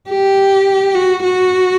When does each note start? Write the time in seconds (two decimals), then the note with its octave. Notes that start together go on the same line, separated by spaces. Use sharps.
0.10 G4
0.95 F#4
1.23 F#4